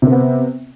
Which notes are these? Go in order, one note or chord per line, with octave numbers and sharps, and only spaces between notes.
C3 B3 C4